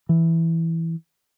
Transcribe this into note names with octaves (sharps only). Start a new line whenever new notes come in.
E3